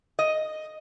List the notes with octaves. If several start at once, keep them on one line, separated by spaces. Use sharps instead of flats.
D#5